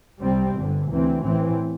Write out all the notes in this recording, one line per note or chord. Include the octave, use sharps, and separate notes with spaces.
C2 C3 G3 C4
G1 G2 D3
D2 C3 E3 C4
A1 A2 E3 C4